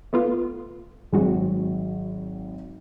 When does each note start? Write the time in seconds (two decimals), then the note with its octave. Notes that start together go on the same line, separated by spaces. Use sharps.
0.13 A3 B3 F4
1.13 G#1 G2 F#3 G#3 C4 F#4